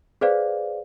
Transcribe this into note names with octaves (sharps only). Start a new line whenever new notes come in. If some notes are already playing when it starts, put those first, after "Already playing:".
G#4 B4 C5 D5 F5